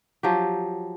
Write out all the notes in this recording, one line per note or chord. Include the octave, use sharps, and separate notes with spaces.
F3 F#3 G4